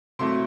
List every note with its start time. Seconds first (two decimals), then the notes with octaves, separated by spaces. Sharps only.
0.19 C3 F#3 A3 E4 C6